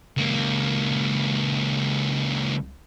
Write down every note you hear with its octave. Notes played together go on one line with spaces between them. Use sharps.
C#2 A#3